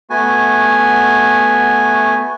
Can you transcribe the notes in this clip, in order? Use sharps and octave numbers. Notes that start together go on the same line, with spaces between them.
A3 B3 F#4 G#5